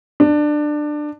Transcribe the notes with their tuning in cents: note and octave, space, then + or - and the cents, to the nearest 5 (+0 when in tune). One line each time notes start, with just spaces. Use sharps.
D4 +20